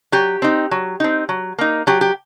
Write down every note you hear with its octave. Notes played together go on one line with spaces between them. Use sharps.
F#3 G4
C4 D#4
F#3
C4 D#4
F#3
A#3 D#4
F#3 G4
G4